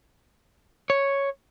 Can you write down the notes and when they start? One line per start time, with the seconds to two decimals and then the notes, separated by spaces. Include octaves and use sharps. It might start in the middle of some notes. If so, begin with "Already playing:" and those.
0.90 C#5